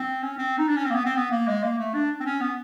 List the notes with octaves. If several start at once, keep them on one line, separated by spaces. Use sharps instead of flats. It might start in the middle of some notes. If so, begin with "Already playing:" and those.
Already playing: C4
C#4
C4
D#4
D4
C#4
C4
A#3
B3
C4
B3
A#3
G#3
A#3
A3
D4
C4
C#4
B3